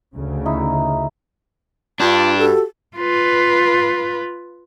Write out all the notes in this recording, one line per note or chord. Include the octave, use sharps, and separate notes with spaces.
D2 C#3
D#4 E4
G2 D4 F4
F#4 G4 A4
F4 B4